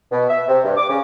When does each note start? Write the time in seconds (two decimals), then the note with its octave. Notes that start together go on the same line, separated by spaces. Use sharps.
0.12 B2
0.29 E5
0.48 C3
0.64 G2
0.77 D6
0.89 C#3